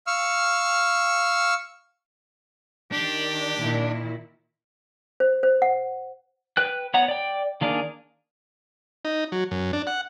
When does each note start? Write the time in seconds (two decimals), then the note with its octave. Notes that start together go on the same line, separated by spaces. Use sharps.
0.07 F5 C#6 E6 F6
2.92 D#3 D4 G4
3.59 A#2 D#3 E4
5.20 C5
5.43 C5
5.62 F#5
6.57 B4 G5 F#6
6.94 B3 C#5 F#5 A#5
7.08 D5 G5
7.61 D#3 A#3 D4 G#4 A#4
9.05 D#4
9.32 F#3
9.51 F#2
9.73 D4
9.87 F#5